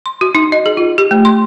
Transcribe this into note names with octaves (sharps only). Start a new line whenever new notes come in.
C6
F#4
D#4
D#5
G#4
F4
G4
A3
C6